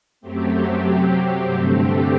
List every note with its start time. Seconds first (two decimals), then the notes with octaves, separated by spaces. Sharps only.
0.21 F#2 F#3 A3 C4 G4
0.83 C3 F#3 C4 G4
1.45 G2 D3 A3 C4 G4
1.76 G4